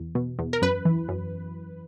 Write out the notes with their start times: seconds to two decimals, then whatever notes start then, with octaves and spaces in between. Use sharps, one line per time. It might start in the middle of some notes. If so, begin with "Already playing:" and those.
Already playing: E2
0.15 B2
0.39 E2
0.53 A#4
0.62 F#2 B4
0.85 E3
1.08 F#2